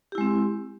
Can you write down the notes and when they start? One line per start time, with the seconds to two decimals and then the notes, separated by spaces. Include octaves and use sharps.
0.12 G4
0.15 E4
0.18 G#3
0.21 C4